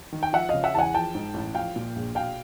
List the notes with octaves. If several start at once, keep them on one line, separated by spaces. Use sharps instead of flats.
D#3
G5
F3 E5 F#5
C#3 D#5 F5
E5 F#5
E2 F#5 G#5 A5
F3 G5 A5
G#2
A1
F3 F5 G5
A#2
A#1
B2 F5 G5